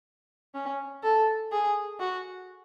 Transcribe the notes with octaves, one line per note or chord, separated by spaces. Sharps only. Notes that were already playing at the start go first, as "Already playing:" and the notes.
C#4
A4
G#4
F#4